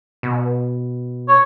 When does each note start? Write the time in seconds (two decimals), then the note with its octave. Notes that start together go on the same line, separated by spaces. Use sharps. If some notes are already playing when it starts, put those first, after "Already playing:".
0.23 B2
1.29 C#5